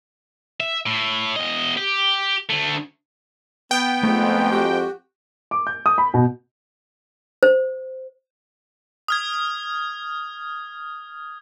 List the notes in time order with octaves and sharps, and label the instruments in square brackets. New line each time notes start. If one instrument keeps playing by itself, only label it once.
[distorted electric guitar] E5
A2
E2 D#5
G4
D2 A3
[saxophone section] B3 [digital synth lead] G5
[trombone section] F2 G#2 [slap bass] A3
[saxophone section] F#4 G4
[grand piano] D6
G6
D#6
B5
B2
[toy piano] C5
[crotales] D#6 F6 G#6